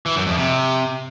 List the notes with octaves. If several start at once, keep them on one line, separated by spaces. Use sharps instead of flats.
E3
F#2
F2
C3